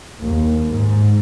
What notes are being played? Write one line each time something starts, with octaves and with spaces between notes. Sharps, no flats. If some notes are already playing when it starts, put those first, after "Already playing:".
D#2
G#2